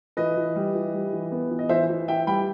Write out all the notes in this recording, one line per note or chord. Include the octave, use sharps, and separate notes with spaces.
E3 B4 D#5
E3
G3
E3
G3
E3
B3
E3
D#5
E3 C5 E5
E3
E3 E5 G5
G3 G5 B5